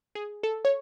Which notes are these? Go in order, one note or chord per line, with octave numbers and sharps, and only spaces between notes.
G#4
A4
C#5